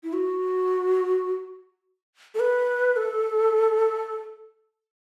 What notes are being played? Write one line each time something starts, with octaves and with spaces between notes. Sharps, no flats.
E4
F#4
A4
B4
A4